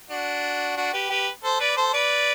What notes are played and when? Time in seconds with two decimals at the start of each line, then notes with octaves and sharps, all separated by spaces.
0.09 D4 F#4
0.76 D4 F#4
0.93 G4 B4
1.10 G4 B4
1.43 A4 C5
1.60 B4 D5
1.77 A4 C5
1.93 B4 D5